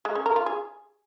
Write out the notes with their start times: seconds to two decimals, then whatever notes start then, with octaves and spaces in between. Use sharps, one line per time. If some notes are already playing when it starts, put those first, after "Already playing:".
0.05 G#3
0.15 C#4
0.26 A#4
0.36 F4
0.46 G#4